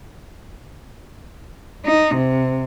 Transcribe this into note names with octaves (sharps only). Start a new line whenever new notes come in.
D#4
C3